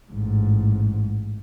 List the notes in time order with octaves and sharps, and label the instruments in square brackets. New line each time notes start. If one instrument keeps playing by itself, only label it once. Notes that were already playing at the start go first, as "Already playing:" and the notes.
[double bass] A1 G#2